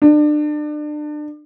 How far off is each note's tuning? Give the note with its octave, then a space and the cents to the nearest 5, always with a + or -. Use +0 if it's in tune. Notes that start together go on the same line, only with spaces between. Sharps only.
D4 +30